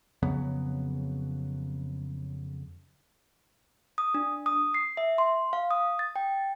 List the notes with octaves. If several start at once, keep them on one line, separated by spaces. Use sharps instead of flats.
F2 C#3 F#3 B3
D#6
D4
D#6
C7
E5
C6
F5
D#6
A6
G5